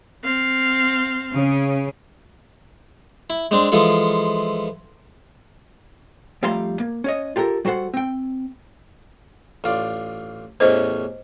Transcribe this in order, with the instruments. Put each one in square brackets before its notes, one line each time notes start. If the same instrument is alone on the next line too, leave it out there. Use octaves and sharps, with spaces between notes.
[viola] C4 F5
[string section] C#3
[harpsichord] E4
G#3 C4 D4
E3 F3 G#3 F4 A4
[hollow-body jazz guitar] F2 G3 A3 F5 A#5 C6
A#3
C#4 C#5 D#5
F4 G4 A4 A#4
G3 F#4 A4 C5 F#5
C4 G5
[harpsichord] A1 F4 D5
[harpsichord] A1 E2 C#4 [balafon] C5 D#5